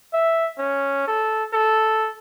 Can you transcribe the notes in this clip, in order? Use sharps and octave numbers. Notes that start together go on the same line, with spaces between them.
E5
C#4
A4
A4